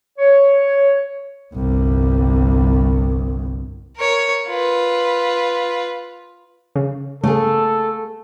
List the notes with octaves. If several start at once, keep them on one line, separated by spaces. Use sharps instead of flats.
C#5
G1 C2
A#4 C#5
F4 B4
C#3
C#3 A3 A#3 G#4 A4